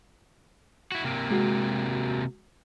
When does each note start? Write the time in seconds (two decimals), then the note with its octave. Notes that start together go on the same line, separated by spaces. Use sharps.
0.92 E4 F#4
1.04 C3 A#3
1.31 G#3 F#4